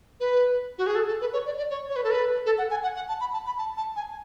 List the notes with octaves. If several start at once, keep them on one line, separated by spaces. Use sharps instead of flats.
B4
F#4
G#4
A4
A4
B4
C#5
D5
D5
C#5
C#5
B4
A4
B4
A4
F#5
G#5
F#5
F#5
A5
B5
A5
B5
A5
A5
G#5